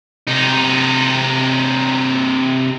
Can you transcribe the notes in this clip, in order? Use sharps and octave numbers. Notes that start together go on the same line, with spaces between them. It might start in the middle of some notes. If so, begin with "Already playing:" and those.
C3 D#4